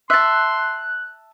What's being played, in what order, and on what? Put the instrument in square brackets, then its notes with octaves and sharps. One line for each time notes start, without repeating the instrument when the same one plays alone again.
[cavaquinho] E5 A5 [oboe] C6 [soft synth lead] F#6